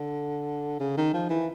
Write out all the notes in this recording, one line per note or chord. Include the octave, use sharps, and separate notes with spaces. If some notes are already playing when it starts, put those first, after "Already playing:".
Already playing: D3
C#3
D#3
F3
E3